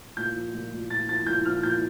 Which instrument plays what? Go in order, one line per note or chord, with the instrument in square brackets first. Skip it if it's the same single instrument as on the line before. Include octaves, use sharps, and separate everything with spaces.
[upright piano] A#2 G6
F3
A#2
A#2
A#2 A6
F3 A6
A#2 G6
F3 F6
A#2 G6